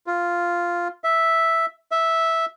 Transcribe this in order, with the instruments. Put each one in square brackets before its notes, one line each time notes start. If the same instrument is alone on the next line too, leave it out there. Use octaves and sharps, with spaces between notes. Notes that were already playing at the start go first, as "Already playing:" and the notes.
[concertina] F4
E5
E5